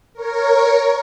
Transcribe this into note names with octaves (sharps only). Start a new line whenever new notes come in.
A#4 C#5